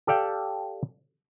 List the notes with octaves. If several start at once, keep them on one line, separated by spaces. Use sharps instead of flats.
G4 A4 D5 F5 G5